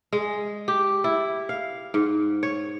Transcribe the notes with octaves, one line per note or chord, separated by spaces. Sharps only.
G#3
G4
E4
F5
G#2
C#5